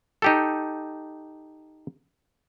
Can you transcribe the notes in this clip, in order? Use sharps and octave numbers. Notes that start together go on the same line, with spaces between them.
D#4 G4 A4